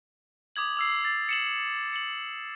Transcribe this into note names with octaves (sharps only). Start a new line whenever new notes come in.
D6 D#6 G#6 F#7
D6 E6 C7
A6
C#7 E7 F#7
C#7 F#7